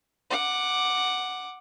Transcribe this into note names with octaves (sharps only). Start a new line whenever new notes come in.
F#5 D6